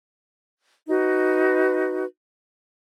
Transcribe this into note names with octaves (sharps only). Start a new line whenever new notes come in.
D#4 F#4 B4